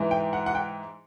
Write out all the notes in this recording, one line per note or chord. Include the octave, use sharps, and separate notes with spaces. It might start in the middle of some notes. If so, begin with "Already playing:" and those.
Already playing: G#2 E3
G5
F#5
F#5
G5